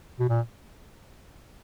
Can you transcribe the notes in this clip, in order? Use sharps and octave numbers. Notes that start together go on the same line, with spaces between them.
B2
A#2